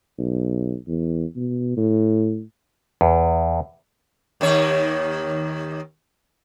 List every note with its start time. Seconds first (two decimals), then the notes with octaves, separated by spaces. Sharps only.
0.19 B1
0.87 E2
1.36 B2
1.77 A2
3.01 E2
4.41 D#2 D#3 C#5